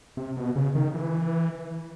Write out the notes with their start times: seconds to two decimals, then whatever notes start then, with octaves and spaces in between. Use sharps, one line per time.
0.17 C3
0.37 B2
0.56 C#3
0.75 D#3
0.94 E3